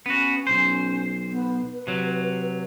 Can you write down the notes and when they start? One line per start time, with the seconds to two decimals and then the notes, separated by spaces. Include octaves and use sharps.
0.06 B3 C#4 F#4
0.47 B1 C#4 C5
1.32 B3
1.73 B4
1.87 C3 F#3